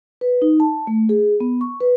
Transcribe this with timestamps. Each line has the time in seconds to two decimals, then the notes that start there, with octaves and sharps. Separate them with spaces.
0.21 B4
0.42 D#4
0.60 A5
0.87 A3
1.09 G#4
1.40 B3
1.61 C#6
1.80 B4